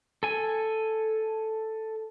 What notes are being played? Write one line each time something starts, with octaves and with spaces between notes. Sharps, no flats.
A4 G#5